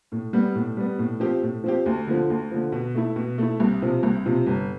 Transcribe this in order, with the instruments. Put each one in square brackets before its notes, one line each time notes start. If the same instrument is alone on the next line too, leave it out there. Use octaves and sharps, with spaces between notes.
[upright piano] A2
G3 B3
A2
G3 B3
A2
F3 C4 G4
A2
F3 C4 G4
D2
D3 F3
D2
D3 F3
B2
A3 E4
B2
A3 E4
C2
C3 F3
C2
C3 F3
G1